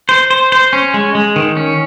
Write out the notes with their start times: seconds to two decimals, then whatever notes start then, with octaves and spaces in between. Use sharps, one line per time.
0.09 C5
0.30 C5
0.52 C5
0.73 C#4
0.94 G#3
1.15 G#3
1.36 D#3
1.57 C#4